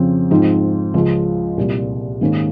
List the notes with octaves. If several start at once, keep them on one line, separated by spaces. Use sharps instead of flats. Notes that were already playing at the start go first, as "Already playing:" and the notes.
Already playing: F2 C#3 F3 C4
G#2 F3 C4 D#4
C#2 C#3 F3 G#3
C2 A#2 G3
G#2 D#3 A#3 C#4